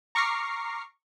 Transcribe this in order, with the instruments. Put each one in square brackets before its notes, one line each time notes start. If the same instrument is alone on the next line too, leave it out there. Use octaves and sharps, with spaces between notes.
[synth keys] A#5 C#6 D6 F6 A#6 C7